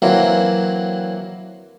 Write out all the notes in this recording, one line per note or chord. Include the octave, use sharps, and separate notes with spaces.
E3 F#3 A#3 C4